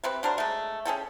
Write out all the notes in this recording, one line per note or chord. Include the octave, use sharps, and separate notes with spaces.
C3 C4 B4
F#3 D4 A#4 C5
G#3 A3
C#4 G#4 A4 G5